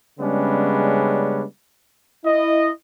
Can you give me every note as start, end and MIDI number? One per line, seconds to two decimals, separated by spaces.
0.19 1.44 49
0.19 1.44 55
0.19 1.44 56
0.19 1.44 59
0.19 1.44 61
0.19 1.44 62
2.25 2.70 64
2.25 2.70 75